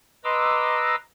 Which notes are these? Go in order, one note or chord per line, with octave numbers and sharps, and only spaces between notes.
B4 D#5 A#5 C6 D6 E6